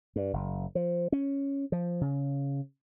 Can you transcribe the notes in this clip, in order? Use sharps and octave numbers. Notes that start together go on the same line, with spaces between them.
G2
F#1
F3
C#4
F3
C#3